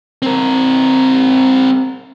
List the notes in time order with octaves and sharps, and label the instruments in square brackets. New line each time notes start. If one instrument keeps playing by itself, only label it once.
[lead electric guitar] C4 A#4